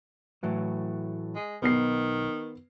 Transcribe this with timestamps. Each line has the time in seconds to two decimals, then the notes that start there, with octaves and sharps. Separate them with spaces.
0.43 A2 E3 F#3
1.35 G#3
1.62 B1 D#3 B3 C7